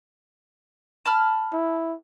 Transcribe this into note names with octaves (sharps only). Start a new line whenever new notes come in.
A5 B5 F6
E4